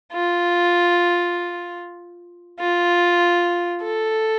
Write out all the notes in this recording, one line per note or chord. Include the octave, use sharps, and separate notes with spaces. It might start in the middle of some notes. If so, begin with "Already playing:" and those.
F4
F4
A4